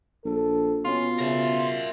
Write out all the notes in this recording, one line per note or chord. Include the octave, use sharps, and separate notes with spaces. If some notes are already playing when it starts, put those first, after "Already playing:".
A#1 A4
B2 C#4 F4
C#3 A#4 E5